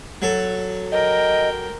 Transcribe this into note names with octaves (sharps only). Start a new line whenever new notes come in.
F#3 A4
A#4 D#5 G5